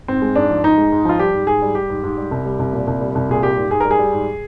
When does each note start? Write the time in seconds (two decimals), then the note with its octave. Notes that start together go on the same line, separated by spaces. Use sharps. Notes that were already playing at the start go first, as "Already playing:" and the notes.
0.08 G#2 C4
0.22 G#3
0.36 G#2 D4
0.50 F3
0.64 G#2 D#4
0.78 G#3
0.92 G#2
1.05 F3 F4
1.19 G3 G4
1.34 G#2
1.47 G#2 G#4
1.62 G3
1.75 G3 G4
1.90 G#2
2.03 G#2
2.17 G3
2.31 C2
2.46 G3
2.59 C2
2.73 A#2
2.87 C2
3.01 G3
3.15 C2
3.29 A#2 G#4
3.43 G3 G4
3.57 G#2
3.71 G#2 G#4
3.80 G3 A#4
3.91 G#4
3.99 G3
4.13 G#2